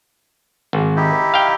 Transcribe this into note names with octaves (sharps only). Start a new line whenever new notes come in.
G#1
D#4 E4 G4
F5 G5